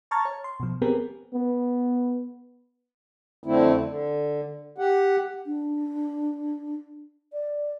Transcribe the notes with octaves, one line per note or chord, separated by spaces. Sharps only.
A5 A#5 C#6 F6 G#6 A6
C#5
C6
B2 F3
B3 C4 G4 G#4 A#4 B4
B3
F2 D3 A3 C4 E4
D3
G4 F#5
D4
D5